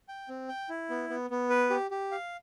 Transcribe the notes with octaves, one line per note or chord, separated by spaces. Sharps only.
G5
C4
G5
E4
B3
B3
B3
B4
G4
G4
F5